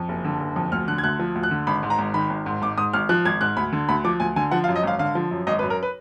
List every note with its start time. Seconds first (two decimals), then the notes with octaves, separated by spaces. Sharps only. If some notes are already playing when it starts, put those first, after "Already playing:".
Already playing: F2
0.09 F#1
0.25 D3
0.40 F#1
0.56 F2
0.72 D2 F6
0.88 D3 F#6
0.98 G#6
1.04 D2 F#6
1.19 F3
1.35 D2
1.43 F#6
1.51 D3
1.67 G#1 B5
1.83 G#2
1.90 A#5
1.99 G#1
2.14 D#3 B5
2.30 G#1
2.46 G#2
2.62 G#1 D6
2.78 G#2 D#6
2.93 G#1 F6
3.09 F3 F#6
3.25 G#1 G#6
3.41 G#2 F#6
3.57 D2 B5
3.73 D3
3.89 D2 B5
4.04 F3 D6
4.20 D2 G#5
4.36 D3 G#5
4.51 F3 F#5
4.64 F5
4.68 F#2
4.76 D#5
4.83 G#1 F5
4.99 D3 F5
5.15 F3
5.31 F#2
5.47 G#1 D#5
5.59 B4
5.63 F#2
5.70 A#4
5.83 B4